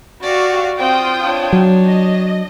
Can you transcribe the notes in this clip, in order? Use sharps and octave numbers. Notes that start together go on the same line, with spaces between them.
F#4 G4 D5 F5
C4 F4 G5 D#6
D4 C#5
F#3
D#5